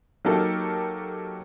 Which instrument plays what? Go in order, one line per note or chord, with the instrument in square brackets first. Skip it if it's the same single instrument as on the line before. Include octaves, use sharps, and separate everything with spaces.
[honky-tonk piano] F#3 A#3 D#4 G4 A4 A#4